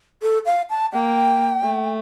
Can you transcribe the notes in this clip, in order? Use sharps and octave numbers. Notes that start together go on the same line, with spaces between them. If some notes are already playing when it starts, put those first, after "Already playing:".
A4
F5
A5
A#3 G5
A3